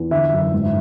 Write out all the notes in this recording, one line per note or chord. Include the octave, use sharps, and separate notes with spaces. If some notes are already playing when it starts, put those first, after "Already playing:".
Already playing: E2
D3 E5
F#2
G#2